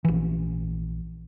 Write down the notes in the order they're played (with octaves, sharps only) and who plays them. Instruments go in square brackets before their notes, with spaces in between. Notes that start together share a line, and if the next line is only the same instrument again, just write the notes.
[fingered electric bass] A#1 E3